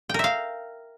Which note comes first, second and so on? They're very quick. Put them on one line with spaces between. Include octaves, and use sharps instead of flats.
G5 A#4 E5 F5